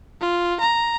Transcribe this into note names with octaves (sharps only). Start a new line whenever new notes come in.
F4
A#5